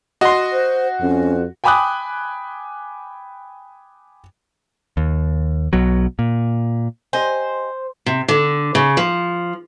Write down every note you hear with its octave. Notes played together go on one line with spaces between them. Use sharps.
F#4 D#5 C6
C5
F2 C#4
G5 G#5 B5 D6 D#6 F#6
D#2
B1 B2 F#3
A#2
G4 C5 D#5 G#5
C3
D3
C#3
F3